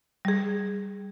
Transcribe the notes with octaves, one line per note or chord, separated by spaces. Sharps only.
G3 G#4